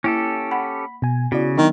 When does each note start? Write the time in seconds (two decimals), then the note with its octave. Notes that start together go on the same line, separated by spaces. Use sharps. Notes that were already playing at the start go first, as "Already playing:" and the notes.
0.04 A#3 C#4 E4 G4 A4
0.51 F#5 B5
1.02 B2 G#5
1.32 C#3 B3 E4 F#4 D5
1.58 D#3 F#3 B3 D4